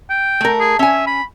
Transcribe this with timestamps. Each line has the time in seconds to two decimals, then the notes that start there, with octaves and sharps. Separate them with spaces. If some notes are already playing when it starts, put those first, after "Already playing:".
0.10 G5
0.41 A3 A#4
0.60 G#4
0.79 C#4 E5 G#5
1.07 B5